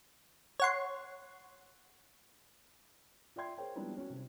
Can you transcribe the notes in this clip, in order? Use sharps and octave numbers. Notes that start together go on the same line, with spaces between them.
C#5 F#5 C6
F4 D5 E5 G5 C6 G#6
G#4 A#4 C5 C#5 G5
F3 G3 G#3 B3 D4 E4
C#4 F#4
C3